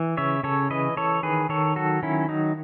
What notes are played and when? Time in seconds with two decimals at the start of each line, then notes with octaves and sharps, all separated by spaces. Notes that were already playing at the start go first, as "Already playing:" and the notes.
Already playing: E3
0.17 C#3 C#5 E5
0.43 C#3 A4 C#5
0.70 E3 B4 D#5
0.97 E3 A4 C#5
1.23 D#3 G#4 B4
1.49 D#3 A4 C#5
1.76 F#3 F#4 A4
2.02 D#3 C#4 E4
2.28 F#3 D#4